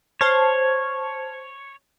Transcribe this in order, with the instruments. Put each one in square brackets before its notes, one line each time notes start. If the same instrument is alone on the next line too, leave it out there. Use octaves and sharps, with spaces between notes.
[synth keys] C5 A5 F6 [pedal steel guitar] C#5